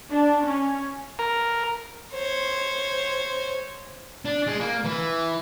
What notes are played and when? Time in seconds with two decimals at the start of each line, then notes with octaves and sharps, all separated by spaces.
0.10 D4
0.45 C#4
1.19 A#4
2.14 C5 C#5
4.25 D4
4.47 G#3
4.61 A#3
4.85 E3